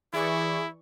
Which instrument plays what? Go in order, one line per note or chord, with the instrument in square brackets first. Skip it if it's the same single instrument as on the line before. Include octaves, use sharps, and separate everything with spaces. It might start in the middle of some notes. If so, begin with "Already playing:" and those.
[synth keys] E3 D5 C#6 [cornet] E4 [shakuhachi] G#4